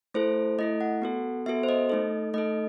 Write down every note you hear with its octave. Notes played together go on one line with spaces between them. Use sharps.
A3 E4 A4 C5
A3 E4 A4 D#5
F#5
B3 F#4 A4
B3 F#4 A4 E5
C5
D#5
A3 D#4 A4
A3 D#4 A4 D#5